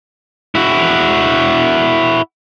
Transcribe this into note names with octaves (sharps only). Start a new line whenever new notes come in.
E4 F#4